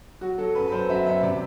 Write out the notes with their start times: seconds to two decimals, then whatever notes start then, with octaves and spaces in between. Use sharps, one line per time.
0.21 F#3 F#4
0.38 F#3 A4
0.55 F#2 B4
0.68 B4
0.72 F#2 C5
0.89 F#3 E5
1.06 F#2 E5
1.23 C3 D5